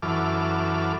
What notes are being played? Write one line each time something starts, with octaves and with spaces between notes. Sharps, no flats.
F#2 E3 A4 D6 F6